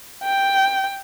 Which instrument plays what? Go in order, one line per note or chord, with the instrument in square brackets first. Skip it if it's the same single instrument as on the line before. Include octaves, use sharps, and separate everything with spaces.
[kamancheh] G5